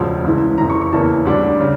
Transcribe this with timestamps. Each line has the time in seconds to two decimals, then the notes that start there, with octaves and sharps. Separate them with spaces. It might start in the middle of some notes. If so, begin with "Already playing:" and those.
Already playing: E1 D2 C#3 F3
0.24 C#2 C#3 E3
0.58 F1 F2 E3 A#5
0.70 C#6
0.81 C#6
0.92 E2 C#3 E3 A#3 A5
1.25 D2 D3 G3 D4
1.60 C#3